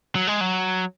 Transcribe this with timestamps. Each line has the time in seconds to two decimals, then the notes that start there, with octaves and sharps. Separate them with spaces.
0.15 F#3
0.27 G#3
0.41 F#3